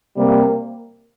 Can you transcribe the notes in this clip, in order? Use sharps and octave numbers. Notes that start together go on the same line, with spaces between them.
C3 G3 A#3